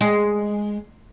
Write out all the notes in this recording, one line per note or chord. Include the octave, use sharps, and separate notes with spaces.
G#3